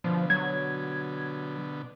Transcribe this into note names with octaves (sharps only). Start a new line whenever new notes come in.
B2 D3 F3
F#3 G#6